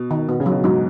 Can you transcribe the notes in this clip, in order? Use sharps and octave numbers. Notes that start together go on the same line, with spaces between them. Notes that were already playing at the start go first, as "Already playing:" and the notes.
Already playing: B2
D#3
B2 B3
C#3
F#3
B2
G#2 F#3